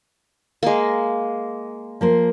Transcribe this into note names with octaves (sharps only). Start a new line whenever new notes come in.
G#3 A#3
F3 A#3 C5